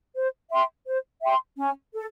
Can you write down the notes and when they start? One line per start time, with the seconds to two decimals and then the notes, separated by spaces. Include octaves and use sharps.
0.15 C5
0.51 E5 G5 C6
0.86 C5
1.21 E5 G5 C6
1.57 C#4
1.93 A4